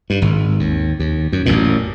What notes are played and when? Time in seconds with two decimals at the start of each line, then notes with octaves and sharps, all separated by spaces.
0.10 G2
0.22 G#1
0.59 D#2
0.99 D#2
1.32 F#2
1.46 A1 F#2 A#2